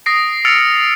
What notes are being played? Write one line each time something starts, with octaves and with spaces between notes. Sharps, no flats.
D#6 A#6 C7 D7
E6 F6 A6 C#7 D7 F7